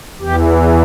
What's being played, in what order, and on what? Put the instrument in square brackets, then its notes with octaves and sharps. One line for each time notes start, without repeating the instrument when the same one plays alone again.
[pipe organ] E2 E3 G4